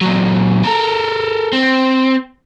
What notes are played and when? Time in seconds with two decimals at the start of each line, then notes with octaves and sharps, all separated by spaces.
0.01 A#2 F#3
0.64 A4 A#4
1.53 C4